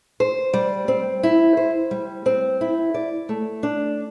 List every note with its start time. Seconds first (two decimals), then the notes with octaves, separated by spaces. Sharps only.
0.20 C5
0.53 G3
0.88 C4
1.23 E4
1.57 C5
1.91 G3
2.26 C4
2.61 E4
2.94 D5
3.29 A3
3.63 D4